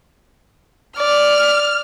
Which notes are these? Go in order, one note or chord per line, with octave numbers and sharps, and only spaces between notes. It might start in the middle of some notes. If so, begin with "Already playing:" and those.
D5 F6